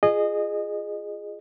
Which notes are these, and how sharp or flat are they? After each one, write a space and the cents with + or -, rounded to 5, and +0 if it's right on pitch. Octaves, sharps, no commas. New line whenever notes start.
F4 +0 G#4 +0 D#5 -25